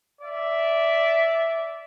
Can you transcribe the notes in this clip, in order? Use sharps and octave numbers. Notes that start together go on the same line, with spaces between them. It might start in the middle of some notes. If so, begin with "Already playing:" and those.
D5 E5